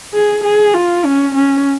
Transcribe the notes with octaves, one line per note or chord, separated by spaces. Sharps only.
G#4
G#4
F4
C#4
C#4